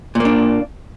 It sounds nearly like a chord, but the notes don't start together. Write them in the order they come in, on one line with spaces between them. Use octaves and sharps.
A#2 A#3 D4